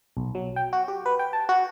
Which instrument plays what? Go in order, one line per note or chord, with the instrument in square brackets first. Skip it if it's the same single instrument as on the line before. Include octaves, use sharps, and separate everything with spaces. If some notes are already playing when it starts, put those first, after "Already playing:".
[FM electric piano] B1
F#3
G5
F#4
G4
B4
G5
A5
F#4